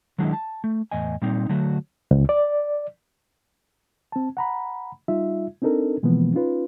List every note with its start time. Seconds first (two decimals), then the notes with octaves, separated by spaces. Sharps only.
0.18 D#3 F#3 G#3 D4 E4
0.33 A5
0.64 A3
0.91 E2 A2 D#5 G#5
1.22 A#2 G3 C4 D#4
1.49 D3 F#3 A3 F#4
2.11 C#2
2.29 D5
4.12 C4 A5
4.37 F#5 A#5 B5
5.08 G3 D#4 F4 E5
5.62 C4 D4 D#4 A4 A#4
6.03 B2 E3 F3 G#3 A#3 B3
6.34 C#4 D#4 F4 B4